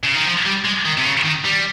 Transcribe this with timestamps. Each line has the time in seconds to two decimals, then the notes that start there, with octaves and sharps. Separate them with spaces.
0.04 C#3
0.15 D#3
0.26 F3
0.46 G3
0.65 G#3
0.86 D#3
0.98 C3
1.05 C#3
1.25 D#3
1.45 G3